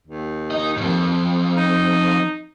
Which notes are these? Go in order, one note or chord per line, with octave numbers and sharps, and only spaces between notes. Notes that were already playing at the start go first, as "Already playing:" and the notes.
D#2
D#4 D#5
F2 G#2
D#4